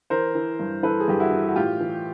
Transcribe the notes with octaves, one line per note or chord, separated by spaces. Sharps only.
E3 A#4 C5
E3
G2
E3 A4 B4
G#4
G2 G4
E4 F#4
E3
F#4
A2 F4 G4
E3